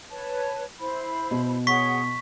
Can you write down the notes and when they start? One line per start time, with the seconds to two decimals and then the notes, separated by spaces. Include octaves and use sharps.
0.10 B4 C#5 A5
0.80 E4 C5 B5
1.31 B2
1.67 G#4 C#5 F#5 C#6 B6